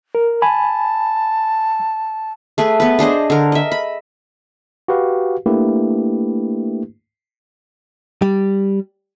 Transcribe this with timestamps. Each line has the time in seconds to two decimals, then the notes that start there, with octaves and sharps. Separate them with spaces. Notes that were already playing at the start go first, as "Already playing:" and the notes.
0.15 A#4
0.42 G#5 A5 B5
2.58 A3 G#4 B4
2.80 B3 B4
2.99 D4 G#4 C5 D#5
3.30 D3 A#4
3.52 D#5 E5
3.72 B5
4.88 F#4 G4 B4 F5
5.46 A3 A#3 D4 E4 G4 B4
8.22 G3